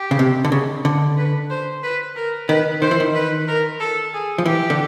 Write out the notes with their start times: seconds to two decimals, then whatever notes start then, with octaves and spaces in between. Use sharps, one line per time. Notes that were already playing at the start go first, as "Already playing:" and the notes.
Already playing: G4
0.11 C#3
0.19 C3
0.45 D3
0.52 C#3
0.85 D3
1.18 B4
1.50 C5
1.83 B4
2.16 A#4
2.48 D#3 B4
2.82 D#3 C5
2.91 E3
3.00 D#3
3.15 B4
3.48 A#4
3.80 A4
4.14 G#4
4.38 F3
4.46 E3 G4
4.70 D3